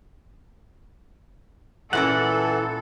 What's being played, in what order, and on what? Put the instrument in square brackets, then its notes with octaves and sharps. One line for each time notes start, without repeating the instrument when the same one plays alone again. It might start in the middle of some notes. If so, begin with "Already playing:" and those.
[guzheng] A#2 C#4 A#4 [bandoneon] E3 [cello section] A4 [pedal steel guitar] F#5